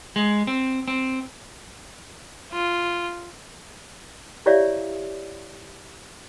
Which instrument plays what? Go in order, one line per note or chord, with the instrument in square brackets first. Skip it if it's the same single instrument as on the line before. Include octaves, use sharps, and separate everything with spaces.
[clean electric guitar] G#3
C4
C4
[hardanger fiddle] F4
[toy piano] E4 G4 C#5 D5 E5 F5